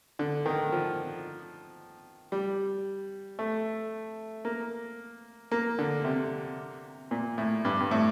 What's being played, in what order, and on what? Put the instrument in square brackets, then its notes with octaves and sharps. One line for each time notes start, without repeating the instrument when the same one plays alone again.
[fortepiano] D3
D#3
F3
G3
A3
A#3
A#3
D3
C3
A#2
A2
G2
G2
A2